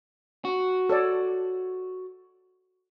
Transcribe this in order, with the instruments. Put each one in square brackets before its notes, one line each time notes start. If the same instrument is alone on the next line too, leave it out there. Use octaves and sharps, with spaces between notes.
[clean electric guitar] F#4
[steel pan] A4 C#5 D5